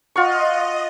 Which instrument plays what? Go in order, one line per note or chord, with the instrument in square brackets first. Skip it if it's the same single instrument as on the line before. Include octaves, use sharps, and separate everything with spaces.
[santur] F4 F#5 C#6 [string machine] D#5